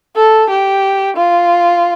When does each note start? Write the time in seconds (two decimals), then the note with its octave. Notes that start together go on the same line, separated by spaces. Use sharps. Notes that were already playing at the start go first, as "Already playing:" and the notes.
0.16 A4
0.50 G4
1.17 F4